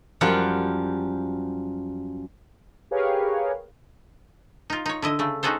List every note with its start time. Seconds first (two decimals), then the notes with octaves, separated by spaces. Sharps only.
0.21 F#2 F3 G3 F4 F#5
2.91 G4 G#4 A#4 B4 C#5 F5
4.70 D#4 F4
4.86 D#4 C#5
5.02 D3 E4 D#5
5.19 C#3 A3
5.43 C#4 D#4 F#4 G#4 A4 C5